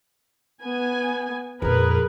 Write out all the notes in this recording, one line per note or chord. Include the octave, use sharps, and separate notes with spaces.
B3 G#5
F2 A#2 G#4 A#4 B4